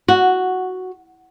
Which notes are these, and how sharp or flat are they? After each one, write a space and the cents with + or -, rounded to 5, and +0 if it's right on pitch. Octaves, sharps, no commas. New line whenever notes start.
F#4 +0